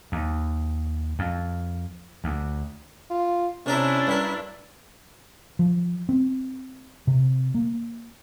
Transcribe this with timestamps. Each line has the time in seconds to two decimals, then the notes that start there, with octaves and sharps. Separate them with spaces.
0.12 D#2
1.19 F2
2.24 D2
3.10 F4
3.66 C3 C#4 D4 E4 A#4 A#5
4.07 G2 G3 A#4
5.59 F3
6.09 C4
7.07 C3
7.54 A#3